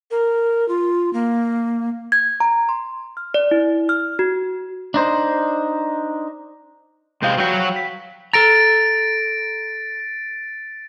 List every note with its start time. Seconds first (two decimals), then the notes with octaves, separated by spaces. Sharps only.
0.11 A#4
0.68 F4
1.13 A#3
2.12 G#6
2.40 A#5
2.69 C6
3.17 F6
3.34 D5
3.51 E4
3.89 F6
4.19 F#4
4.94 D4 D#4 C5
7.22 C3 G#3 C4 F5 G6
7.38 F#3 F#4 B4 G5
7.76 B6
8.33 A4 A#5 A6 A#6 D7